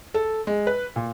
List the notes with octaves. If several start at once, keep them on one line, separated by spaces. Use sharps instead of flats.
A4
G#3
B4
A#2